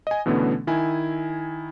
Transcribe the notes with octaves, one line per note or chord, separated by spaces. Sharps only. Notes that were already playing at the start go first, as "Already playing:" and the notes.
D#5 G#5
B2 D3 E3 A3 B3 C#4
D#3 E4 G#5